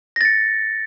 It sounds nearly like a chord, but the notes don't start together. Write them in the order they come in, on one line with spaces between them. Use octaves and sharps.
A#6 A6 C#7